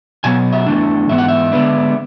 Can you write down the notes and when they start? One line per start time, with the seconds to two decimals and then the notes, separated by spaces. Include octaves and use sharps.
0.24 B2 F#3 B3 G#5
0.52 E5
0.66 E2 C#3 E3 A3 D4
1.09 G#2 E3 B3 E5
1.18 F#5
1.28 E5
1.52 D3 G#3 B3 D4